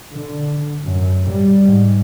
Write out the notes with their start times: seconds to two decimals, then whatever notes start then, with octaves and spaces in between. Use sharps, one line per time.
0.15 D3
0.84 F#2
1.29 G3
1.66 G#2